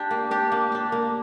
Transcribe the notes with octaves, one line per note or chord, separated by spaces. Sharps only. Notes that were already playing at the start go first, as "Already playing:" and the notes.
Already playing: D4 G4
A#3
D4 G4
A#3
D4 G4
A#3